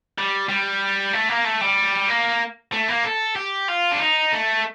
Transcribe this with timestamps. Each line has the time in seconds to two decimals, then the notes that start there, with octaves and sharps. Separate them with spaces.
0.18 G3
0.49 G3
1.13 A3
1.29 A#3
1.45 A3
1.61 G3
2.08 A#3
2.72 A3
2.88 A#3
3.05 A4
3.36 G4
3.68 F4
3.91 D4
4.00 D#4
4.32 A3